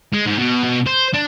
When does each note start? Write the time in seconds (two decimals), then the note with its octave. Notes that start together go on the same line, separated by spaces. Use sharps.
0.14 G#3
0.27 G#2
0.38 B2
0.64 B2
0.86 C5
1.14 D4